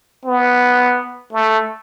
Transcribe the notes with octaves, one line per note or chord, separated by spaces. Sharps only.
B3
A3